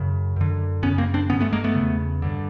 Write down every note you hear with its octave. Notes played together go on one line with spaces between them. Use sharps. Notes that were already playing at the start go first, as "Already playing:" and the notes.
Already playing: F#2 C#3
F#2 D3
F#2 C#3 B3 C#4
A#3 C4
C4 D4
G2 D3 B3 C#4
A3 B3
G#3 A#3
A3 B3
E2 C#3
G2 D3